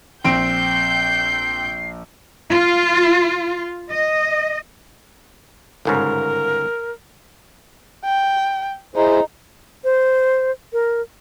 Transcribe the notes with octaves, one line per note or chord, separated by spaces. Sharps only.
A#1 C4 G5 G6 C7 D7
F4
D#5
G1 G#2 C#3 A#4
G5
D#4 E4 G#4 C5
C5
A#4